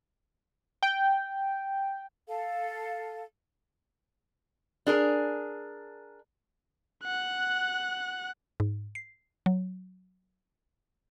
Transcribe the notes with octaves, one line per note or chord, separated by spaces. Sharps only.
G5
A4 F5
D4 G#4 A#4
F#5 F#6
G#2
C7
F#3